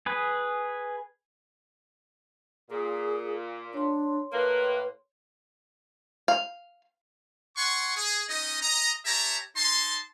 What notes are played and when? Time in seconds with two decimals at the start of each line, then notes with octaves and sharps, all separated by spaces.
0.06 G#4 B4
2.71 A#2 G#4
3.74 D4 C#5 C6
4.33 A2 A#3 B4
6.28 F5
7.57 F#5 G#5 C6 C#6
7.96 G#4
8.29 C#4 D#4 D#5
8.62 D#5 A#5
9.05 G4 C#5 E5 A5 A#5
9.56 D#4 A5 C6